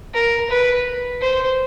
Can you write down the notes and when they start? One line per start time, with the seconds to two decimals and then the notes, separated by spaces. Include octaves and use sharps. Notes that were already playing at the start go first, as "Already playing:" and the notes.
0.14 A#4
0.50 B4
1.21 C5